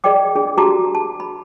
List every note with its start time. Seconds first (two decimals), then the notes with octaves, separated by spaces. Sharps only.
0.04 G#4 D5 D#5 G5 D6
0.35 D4 G#4
0.58 F#4 G4 A5 A#5 D6
0.95 A5
1.20 B5